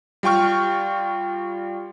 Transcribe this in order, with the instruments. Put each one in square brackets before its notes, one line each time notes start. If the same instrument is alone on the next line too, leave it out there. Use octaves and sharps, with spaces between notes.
[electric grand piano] G3 F4 G5 C#6 F6